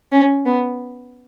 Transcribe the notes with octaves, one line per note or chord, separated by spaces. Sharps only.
C#4
B3